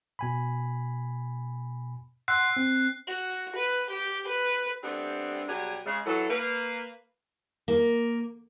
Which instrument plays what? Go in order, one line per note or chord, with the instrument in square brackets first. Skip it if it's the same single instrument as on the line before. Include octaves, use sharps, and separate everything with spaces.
[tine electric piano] B2 G#5 B5
[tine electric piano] F#5 C6 E6 [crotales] F#6 C7
[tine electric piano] C4
[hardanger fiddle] F#4
B4
G4
B4
[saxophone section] G3 A3 B3 C4 D4 G4
B2 F#3 G3 G4 G#4
C#3 G#3
E3 F#3 A4
A#3 B4
[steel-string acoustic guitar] A#3